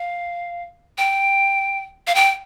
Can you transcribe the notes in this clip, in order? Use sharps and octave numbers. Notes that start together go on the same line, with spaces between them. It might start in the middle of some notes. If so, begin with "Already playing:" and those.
Already playing: F5
G5
F5
G5